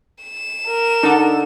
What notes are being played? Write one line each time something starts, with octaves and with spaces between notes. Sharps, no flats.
E7
A#4
D3 D4 D#4 A4